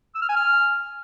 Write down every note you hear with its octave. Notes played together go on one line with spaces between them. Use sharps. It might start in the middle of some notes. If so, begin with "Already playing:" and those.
E6
F6
G#5
F6